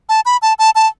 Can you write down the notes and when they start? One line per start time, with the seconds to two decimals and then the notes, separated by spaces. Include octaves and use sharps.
0.09 A5
0.25 B5
0.42 A5
0.59 A5
0.75 A5